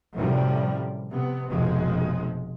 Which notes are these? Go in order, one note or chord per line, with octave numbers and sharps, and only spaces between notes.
F#2 A2 C3 F3 G3
C3 B3
F1 B1 F2 F3 G#3